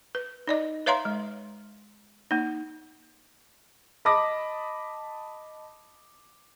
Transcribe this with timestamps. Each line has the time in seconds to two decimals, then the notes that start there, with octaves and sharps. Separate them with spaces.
0.15 B4
0.47 D#4 D5 D#5
0.86 B4 C#5 E5 F5 A#5 C6
1.05 G#3
2.31 A#3 D#4
4.05 D#5 A5 B5 D6 D#6 A#6